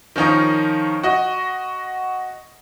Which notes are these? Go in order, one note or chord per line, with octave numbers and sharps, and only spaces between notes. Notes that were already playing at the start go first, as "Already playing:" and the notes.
D#3 F3 C#4 D#4 A#4
F#4 D#5